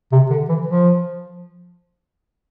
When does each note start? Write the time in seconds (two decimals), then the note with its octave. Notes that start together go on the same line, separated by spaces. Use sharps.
0.12 C3
0.30 D3
0.49 E3
0.67 F3